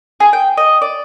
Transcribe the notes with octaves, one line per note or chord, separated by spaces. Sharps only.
G#4
G5
D#5
D5